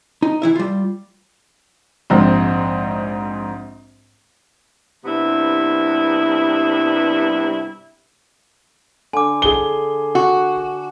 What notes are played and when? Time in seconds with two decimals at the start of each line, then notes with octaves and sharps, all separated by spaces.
0.22 D#4
0.42 E3 E4 E5
0.55 G3 F4
2.10 A#1 G#2 C4
5.05 G2 C3 G3 B3 E4
9.13 D3 G#5 D6
9.42 G#4 G7
10.15 F#4